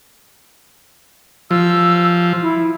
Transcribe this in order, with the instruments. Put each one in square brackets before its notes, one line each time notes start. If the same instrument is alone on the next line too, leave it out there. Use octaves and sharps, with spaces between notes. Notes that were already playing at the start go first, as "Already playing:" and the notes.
[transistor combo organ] F3 [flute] E6
[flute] E4